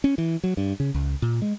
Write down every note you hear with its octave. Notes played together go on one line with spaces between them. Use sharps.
C#4
E3
F#3
G2
C#3
C#2
A#2
G#3